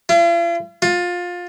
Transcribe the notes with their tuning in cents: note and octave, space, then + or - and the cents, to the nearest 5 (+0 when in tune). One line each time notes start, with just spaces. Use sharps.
F4 -45
F4 +20